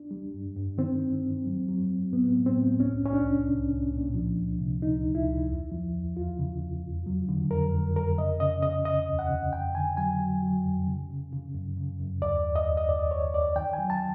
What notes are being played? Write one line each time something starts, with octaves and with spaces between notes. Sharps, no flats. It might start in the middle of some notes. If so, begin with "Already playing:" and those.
Already playing: D4
G3
G2
G2
D#3 C4
D#3
G2
F#3
F#3
F#3
A2 B3
A2
C4
A2
C2 C#4
C2 C#4
D4
C2
C2
C2
A#2
F3
C#2
C3
C#2 D#4
C#2
E4
C#2
E2
F3
E2
E2 F4
C#3
E2
F2
F#3
D3
F2 A#4
F2
F2 A#4
C#3 D#5
C#3 D#5
C#3 D#5
C#3 D#5
D#2
F#5
C#3
F2 G5
D3 G#5
F#3 G#5
F#3
F#3
F2
C#3
C#3
C#3
F#2
C#3
F#2
D#2 D5
D#2
D#5
D#2
D#5
D#2 D5
D#2 C#5
D#2 D5
D#3 G5
G#5
F#3
A5